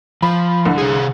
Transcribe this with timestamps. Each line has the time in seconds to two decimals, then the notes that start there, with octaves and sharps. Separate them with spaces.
0.22 F3 B5
0.65 C2 D3
0.78 C3 G#4